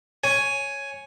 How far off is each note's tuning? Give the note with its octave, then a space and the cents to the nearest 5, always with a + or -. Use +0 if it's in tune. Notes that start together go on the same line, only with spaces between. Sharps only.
C#5 +0 G#5 +5